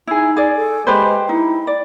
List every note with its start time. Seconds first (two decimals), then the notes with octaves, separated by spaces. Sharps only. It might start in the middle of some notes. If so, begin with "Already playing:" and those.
0.07 D#4 E4 G#4
0.37 G#4 D5
0.56 A4
0.87 G#3 G4 B4 C5
1.29 D#4 E4
1.67 D5